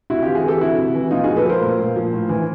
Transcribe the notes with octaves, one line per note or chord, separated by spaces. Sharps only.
C3 E4 F#4
E3 F4 G4
F#4 G#4
E3 G4 A4
C3 E4 F#4
C3
E3
A#2 D#4 F4
F3 F#4 G#4
A4 B4
F3 A#4 C5
A#2
A#2
F3
A2
E3